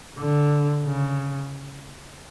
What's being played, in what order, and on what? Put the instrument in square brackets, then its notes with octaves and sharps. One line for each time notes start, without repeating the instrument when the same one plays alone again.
[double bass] D3
C#3